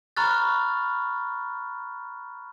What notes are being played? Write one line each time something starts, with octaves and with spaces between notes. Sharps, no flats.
A#5 B5 C#6 F6 F#6 A6